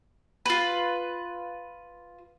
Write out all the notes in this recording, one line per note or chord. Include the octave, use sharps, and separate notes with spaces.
F4 B4